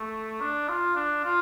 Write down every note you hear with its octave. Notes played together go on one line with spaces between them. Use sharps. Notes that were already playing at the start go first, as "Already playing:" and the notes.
Already playing: A3
D4
F4
D4
F4